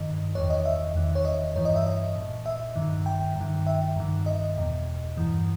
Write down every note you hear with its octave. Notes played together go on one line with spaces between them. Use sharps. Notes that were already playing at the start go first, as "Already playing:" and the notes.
Already playing: G2 D#3 D#5
E2 D#3 C#5
D#5
E5
E2 D#3
C#5
D#5
G2 E3 C#5
D#5
E5
D#5
A#2
E5
G2 D#3
G5
G2 D#3
E5
G2 D#3
D#5
E2 B2
G2 E3